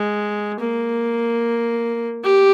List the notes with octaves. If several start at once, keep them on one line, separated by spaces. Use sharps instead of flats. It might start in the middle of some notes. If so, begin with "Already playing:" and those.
Already playing: G#3
A#3
G4